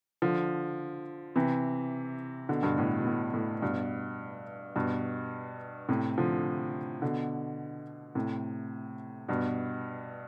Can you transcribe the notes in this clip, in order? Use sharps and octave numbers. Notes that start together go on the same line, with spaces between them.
D3 F3
C3 E3
B2 D3
G2 B2
A2
B2
A2
A2
G2 B2
G2 B2
A2 C3
D3 F3
B2 D3
A2 C3
G2 B2